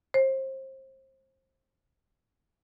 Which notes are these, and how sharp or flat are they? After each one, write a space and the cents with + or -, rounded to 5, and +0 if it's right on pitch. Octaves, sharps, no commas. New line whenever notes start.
C5 +30